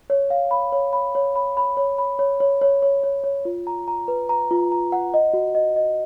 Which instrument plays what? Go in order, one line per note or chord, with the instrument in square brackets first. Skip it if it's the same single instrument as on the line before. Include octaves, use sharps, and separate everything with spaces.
[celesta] C#5
F5
B5
C#5
B5
C#5
B5
B5
C#5
B5
C#5
C#5
C#5
C#5
C#5
C#5
F4
A#5
A#5
B4
A#5
F4
A#5
F#5
D#5
F#4
D#5
D#5